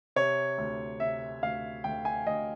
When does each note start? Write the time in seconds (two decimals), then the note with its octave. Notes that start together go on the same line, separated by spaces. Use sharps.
0.16 C3 C#5
0.58 D2
1.00 C3 E5
1.43 D2 F5
1.84 D2 G5
2.05 G#5
2.26 D2 D#5